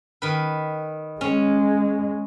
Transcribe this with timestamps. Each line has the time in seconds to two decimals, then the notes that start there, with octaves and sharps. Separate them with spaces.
0.22 D#3 B4
1.21 G#3 C#4